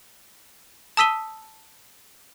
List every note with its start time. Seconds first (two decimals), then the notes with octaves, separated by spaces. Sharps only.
0.97 A5 D#6 E6 B6 D#7 G7